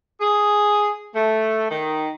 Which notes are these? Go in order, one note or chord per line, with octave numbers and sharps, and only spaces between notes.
G#4
A3
D#3